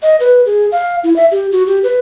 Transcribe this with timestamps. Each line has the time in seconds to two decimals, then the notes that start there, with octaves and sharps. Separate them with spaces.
0.02 D#5
0.20 B4
0.46 G#4
0.72 F5
1.04 E4
1.16 E5
1.31 G4
1.52 F#4
1.66 G4
1.84 B4